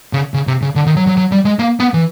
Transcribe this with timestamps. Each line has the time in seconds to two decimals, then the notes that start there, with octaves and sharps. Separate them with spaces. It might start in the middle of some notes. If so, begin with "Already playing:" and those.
0.13 C#3
0.34 C#3
0.47 C3
0.62 C#3
0.76 D3
0.86 D#3
0.96 F#3
1.07 F#3
1.17 F#3
1.32 G3
1.45 G#3
1.59 A#3
1.80 B3
1.94 E3